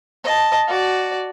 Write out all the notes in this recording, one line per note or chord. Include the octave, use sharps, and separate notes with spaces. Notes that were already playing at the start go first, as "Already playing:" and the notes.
D#5 A5
F#4 D5